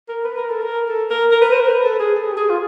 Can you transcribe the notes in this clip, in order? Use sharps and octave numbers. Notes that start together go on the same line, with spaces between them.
A#4
B4
A#4
A4
A#4
A4
A#4
A#4
B4
C5
A#4
B4
A4
G#4
A4
G4
G#4
F4